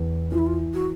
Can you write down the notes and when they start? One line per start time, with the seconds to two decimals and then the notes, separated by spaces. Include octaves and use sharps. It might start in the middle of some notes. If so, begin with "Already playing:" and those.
Already playing: E2
0.31 E3 F4
0.38 E4
0.47 F4
0.74 F#4